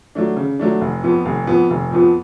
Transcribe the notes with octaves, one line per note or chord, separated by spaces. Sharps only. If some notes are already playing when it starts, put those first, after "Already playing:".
F#3 A3 D4
C#3
F#3 A3 D4
F1
F2 F3 B3
F1
F2 F3 B3
F1
F2 F3 B3